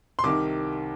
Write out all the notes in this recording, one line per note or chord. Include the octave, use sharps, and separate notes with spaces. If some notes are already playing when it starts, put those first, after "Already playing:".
C6
C2 C3 D#3 D6